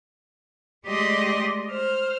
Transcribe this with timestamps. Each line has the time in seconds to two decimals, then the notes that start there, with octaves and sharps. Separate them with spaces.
0.86 G#3 A3 G4 D5 D#5 C6
1.69 C5 F6